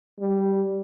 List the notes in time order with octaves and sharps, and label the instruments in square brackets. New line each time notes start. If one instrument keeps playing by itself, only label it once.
[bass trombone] G3